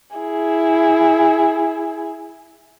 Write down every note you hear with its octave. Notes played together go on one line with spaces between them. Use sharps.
E4 G#4